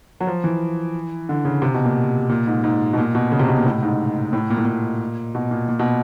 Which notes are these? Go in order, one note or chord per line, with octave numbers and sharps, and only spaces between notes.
F#3
F3
E3
D3
C#3
C3
B2
A#2
A#2
G#2
G#2
B2
A#2
B2
C#3
C3
B2
A#2
A2
G#2
A2
A#2
A2
A#2
B2
A#2
A#2
B2